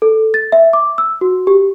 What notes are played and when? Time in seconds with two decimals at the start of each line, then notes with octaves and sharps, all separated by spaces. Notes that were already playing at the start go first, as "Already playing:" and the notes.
0.02 A4
0.34 A6
0.52 E5
0.73 D6
0.98 E6
1.21 F#4
1.47 G4